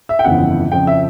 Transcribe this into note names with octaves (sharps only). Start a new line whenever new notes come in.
E5
G5
G1 F2 C#3 E3 F#5
F2 C#3 F3 G5
E5